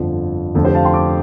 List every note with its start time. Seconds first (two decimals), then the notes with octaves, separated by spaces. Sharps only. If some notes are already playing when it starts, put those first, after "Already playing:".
Already playing: G1 F2 D3 F3
0.55 F1 F2 D3 A4
0.65 G4 C5
0.75 F5 A5
0.84 G5 C6
0.94 A5 D6